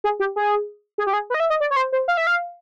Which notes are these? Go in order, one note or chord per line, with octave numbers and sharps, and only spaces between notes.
G#4
G4
G#4
G#4
G4
G#4
B4
D#5
E5
D#5
D5
C#5
C5
C5
F5
E5
F5